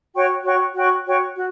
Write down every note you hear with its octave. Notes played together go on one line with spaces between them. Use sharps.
F#4 C#5 G5 C#6
F#4 C#5 G5 C#6
F#4 C#5 G5 C#6
F#4 C#5 G5 C#6
F#4